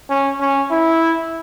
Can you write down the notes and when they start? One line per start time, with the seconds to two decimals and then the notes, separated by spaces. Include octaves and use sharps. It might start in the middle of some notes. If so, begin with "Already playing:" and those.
0.10 C#4
0.41 C#4
0.70 E4